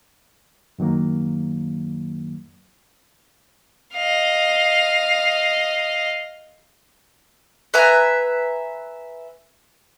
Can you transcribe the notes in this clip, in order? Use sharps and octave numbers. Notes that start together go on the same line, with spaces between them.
F#2 D#3 F#3 A#3
D#5 F5
B4 E5 G#5 A#5